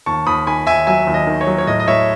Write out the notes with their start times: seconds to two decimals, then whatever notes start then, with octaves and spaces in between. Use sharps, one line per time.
0.06 D#2 A5 C#6
0.26 D#2 B5 D#6
0.47 D#3 G#5 B5
0.67 D#2 E5 G#5
0.87 F#3 E5 G#5
1.07 D#2
1.14 D#5
1.27 D#3
1.41 C#5
1.47 F#3
1.58 C#5
1.67 A2 D#5
1.80 D#5
1.88 A2 C#5 E5